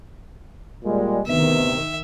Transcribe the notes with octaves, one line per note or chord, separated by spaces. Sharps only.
A#2 G3 G#3
D2 C3 D#3 B3 E5